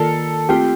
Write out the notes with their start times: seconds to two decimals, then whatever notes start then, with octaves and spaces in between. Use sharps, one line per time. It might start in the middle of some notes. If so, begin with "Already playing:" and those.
Already playing: D#3 A#3 F4 A4 A#4 D5
0.49 A3 C4 F4 G4